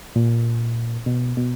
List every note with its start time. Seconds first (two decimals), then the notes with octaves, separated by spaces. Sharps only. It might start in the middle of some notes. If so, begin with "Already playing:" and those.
0.16 A#2
1.06 B2
1.37 B2